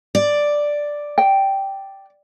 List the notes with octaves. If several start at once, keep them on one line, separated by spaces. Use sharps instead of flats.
D5
G5